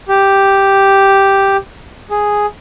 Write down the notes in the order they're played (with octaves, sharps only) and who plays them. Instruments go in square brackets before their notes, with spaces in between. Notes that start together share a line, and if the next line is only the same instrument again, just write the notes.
[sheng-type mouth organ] G4
G#4